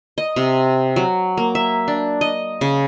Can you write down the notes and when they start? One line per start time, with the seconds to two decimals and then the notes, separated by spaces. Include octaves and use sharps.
0.18 D#5
0.36 C3
0.96 F#3
1.37 A#3
1.55 E5
1.88 D4
2.21 D#5
2.61 C#3